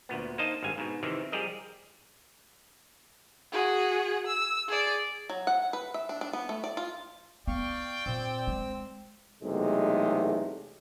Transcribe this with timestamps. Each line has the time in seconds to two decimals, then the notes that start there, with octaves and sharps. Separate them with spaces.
0.09 D2 A#2 B3
0.38 A#3 D#4 C5 D#5 A5
0.63 G#1 G2 F5 G#5
0.78 G#2 B2
1.03 C3 D#3 E3
1.32 F3 G3 G4 G#4 A#4 D#5
3.52 F#4 G#4
4.26 E6
4.68 G#4 D5
5.29 F#3
5.47 F#5
5.73 B4
5.94 E5
6.09 D4
6.21 D4
6.33 B3
6.49 A3
6.64 D5
6.77 F4
7.47 B3 D5 F5 G5 C#6
8.06 A#2 C4 E6
8.47 G#3
9.42 B1 E2 C3 G#3 A3